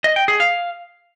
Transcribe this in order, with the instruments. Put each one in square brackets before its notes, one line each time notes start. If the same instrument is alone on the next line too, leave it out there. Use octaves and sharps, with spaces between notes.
[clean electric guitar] D#5
G5
G#4
F5